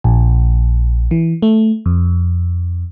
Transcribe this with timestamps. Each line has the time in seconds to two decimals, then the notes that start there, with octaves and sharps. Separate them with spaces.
0.04 A#1
1.11 E3
1.42 A3
1.86 F2